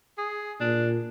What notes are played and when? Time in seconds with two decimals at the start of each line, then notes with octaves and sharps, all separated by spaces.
0.18 G#4
0.61 A#2 D4